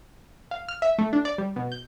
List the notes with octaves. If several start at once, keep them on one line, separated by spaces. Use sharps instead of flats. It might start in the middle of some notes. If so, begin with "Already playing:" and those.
F5
F6
E5
A3
D4
D5
G3
B2
G6